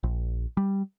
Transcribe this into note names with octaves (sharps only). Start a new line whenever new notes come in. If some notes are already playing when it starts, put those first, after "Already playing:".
A#1
G3